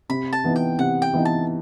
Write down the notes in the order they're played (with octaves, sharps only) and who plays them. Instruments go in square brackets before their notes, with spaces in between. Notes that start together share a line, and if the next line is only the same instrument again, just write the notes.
[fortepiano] C3 [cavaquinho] B5
[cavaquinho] A5
[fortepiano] E3 B3 D#4
[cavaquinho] G5
[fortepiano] C3 [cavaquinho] F#5
[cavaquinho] G5
[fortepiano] E3 B3 D#4
[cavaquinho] A5